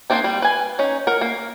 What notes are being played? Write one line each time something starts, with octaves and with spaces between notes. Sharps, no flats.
A#3 C4 D4 D#4
G3
B4 G#5
C#4 D#4
A#4 F#5
A#3